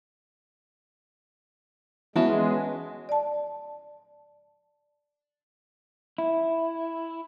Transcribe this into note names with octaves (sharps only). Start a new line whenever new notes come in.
E3 G#3 B3 C#4 F#4 E5 A5
D5 A5
E4